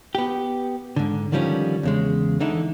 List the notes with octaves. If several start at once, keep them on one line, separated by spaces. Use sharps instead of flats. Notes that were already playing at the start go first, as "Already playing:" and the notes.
B3 G4
G#2 D3
D3 D#3 F3 G3 C4 C#4
E2 C#3 G#3
D3 E3 D#4 E4